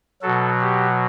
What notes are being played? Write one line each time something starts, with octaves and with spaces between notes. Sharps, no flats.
B2 F#3 A4
G4